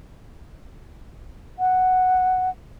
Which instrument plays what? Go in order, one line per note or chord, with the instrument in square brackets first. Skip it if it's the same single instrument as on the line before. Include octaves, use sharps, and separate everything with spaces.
[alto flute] F#5